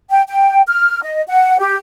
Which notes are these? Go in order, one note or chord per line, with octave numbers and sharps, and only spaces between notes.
G5
G5
F6
D#5
F#5
G4